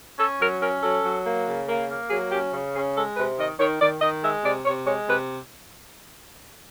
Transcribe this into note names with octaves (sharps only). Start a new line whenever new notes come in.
C#4 A4
F#3 A#4
C#4 A#4
F#3 A4
F#3
A#3
C#3
A#3
A#3
F#3 G#4
C#4 G4
C#3
C#4 G#4
G#3 A4
C3 B4
D#3 D#5
D#3 C#5
D#3 D5
D#3 D#5
G#3 E5
C3 D5
C3 C#5
G#3 C#5
C3 B4